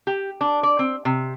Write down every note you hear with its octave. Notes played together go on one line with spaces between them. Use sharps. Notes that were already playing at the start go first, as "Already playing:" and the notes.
G4
D4
D5
C4
C3